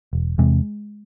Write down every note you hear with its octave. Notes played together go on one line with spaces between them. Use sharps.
E1
E2 C3 G#3